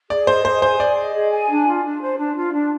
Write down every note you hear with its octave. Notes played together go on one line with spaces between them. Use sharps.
G#4 D5
C5 D#5
G#4 C5
C5 G#5
G#4 D5
D#5
G#4
G#5
D4
F4
D4
C5
D4
F4
D4